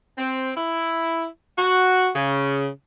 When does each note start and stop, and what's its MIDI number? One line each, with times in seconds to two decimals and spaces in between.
0.18 0.52 60
0.57 1.27 64
1.58 2.11 66
2.16 2.68 49